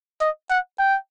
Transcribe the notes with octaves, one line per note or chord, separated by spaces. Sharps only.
D#5
F#5
G5